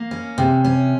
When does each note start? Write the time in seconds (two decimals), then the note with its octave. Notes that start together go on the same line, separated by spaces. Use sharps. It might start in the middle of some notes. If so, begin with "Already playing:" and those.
Already playing: A#3
0.11 C#4
0.38 C3
0.64 C#4